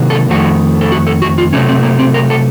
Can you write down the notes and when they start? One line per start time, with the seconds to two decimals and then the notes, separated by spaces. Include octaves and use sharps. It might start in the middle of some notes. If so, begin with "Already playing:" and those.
Already playing: C3 D#3 F#3 A#3
0.10 A4
0.30 F2 D#3 A3 F#4
0.81 A4
0.92 F#4
1.07 A4
1.22 F#4
1.38 F4
1.53 C3 F#3 A3 C#4
1.69 C4
1.83 A#3
1.99 C4
2.14 A#4
2.30 A4